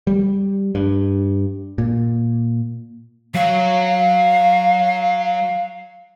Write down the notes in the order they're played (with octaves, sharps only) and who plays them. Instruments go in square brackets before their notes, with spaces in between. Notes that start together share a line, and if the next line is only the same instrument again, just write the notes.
[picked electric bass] G3
G2
A#2
[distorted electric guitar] F#3 C#5 [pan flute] F5